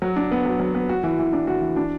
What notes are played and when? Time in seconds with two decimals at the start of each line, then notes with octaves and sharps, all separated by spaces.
0.02 F#3
0.16 D4
0.31 B3
0.45 F#3
0.60 F#3
0.75 B3
0.89 F#4
1.03 E3
1.19 E3
1.33 D4
1.47 F#4
1.61 E3
1.76 D4